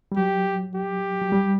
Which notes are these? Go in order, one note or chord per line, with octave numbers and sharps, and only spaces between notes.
G3
F#3 G4
G4
F#3
G3